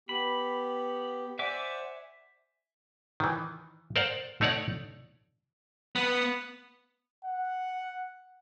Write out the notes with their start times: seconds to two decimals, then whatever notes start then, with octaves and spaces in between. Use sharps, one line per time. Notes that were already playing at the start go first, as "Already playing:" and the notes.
0.09 B3 G4 B5
1.39 C5 D5 E5 F#5 G#5 D6
3.20 D#3 E3
3.96 A#4 C5 D5 F5 F#5
4.41 A3 D#4 C#5 D5 F#5
5.96 B3
7.24 F#5